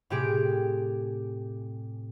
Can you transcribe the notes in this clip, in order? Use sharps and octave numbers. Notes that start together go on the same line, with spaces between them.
A2 C3 G4 G#4 D7